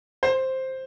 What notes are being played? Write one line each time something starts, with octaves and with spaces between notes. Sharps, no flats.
C5